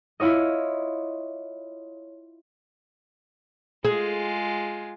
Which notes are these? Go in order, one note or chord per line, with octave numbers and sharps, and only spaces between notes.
E4 F4 C#5 D#5
G#3 F4 G#4